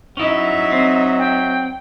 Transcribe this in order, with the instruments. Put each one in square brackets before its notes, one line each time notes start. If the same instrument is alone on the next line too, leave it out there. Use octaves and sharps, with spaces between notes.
[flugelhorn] F#3 [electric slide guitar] C#4 E4 [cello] D#4 E5
[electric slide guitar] C4
[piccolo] G5